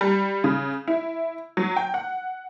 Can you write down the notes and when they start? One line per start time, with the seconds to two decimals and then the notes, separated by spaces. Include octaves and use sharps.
0.01 G3
0.44 C#3
0.88 E4
1.57 F#3
1.76 G5
1.94 F#5